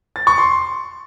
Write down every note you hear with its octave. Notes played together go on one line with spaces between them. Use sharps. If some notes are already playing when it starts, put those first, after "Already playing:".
A6
C#6
C6